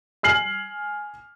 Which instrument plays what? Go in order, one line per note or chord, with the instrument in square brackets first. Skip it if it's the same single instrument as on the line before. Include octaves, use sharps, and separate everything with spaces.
[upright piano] G#5 F6 C7 F#7